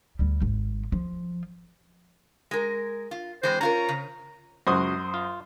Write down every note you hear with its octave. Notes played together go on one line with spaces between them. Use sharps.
D2 G3
G#1
F3
G#3 A#4
F4
E3 G#3 C4 C5
C#4 F4 A#4 A#5
C#3
C#2 F#2 F#4 C5 D#6
F4